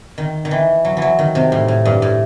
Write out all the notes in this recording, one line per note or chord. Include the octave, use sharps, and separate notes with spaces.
D#3
D#3
E3
F#3
E3 F#3
D#3
C3
A2
A2
G2
A2